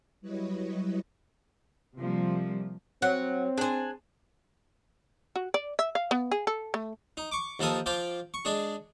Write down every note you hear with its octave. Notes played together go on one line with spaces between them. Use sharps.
F#3 G3 E4 B4 C#5 D#5
C3 F3 G3 A#3
F#3 C4 F#5
D4 G#4 C5 G#5
F#4
D5
E5
F5
B3
G#4
A4
A3
D#4
C#6 D6
D#2 F3 A4 A#4 D#6
F3 F4 G5 D6
C#6
G#3 D4 G#4